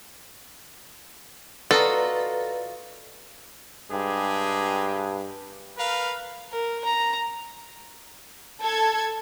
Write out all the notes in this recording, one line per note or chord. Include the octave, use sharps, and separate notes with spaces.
F4 F#4 A4 B4 D5 D#5 A#5
G2 G#3 G4 G#4
A#4 B4 F5
A#4
A#5
A4 A5 G#6